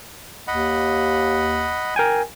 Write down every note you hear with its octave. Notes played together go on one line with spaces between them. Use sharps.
D#2 D#5 F#5 B5
A#4 G5 G#5